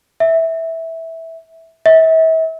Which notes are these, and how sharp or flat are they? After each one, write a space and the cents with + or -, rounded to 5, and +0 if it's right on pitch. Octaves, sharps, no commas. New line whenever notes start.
E5 -10
E5 -40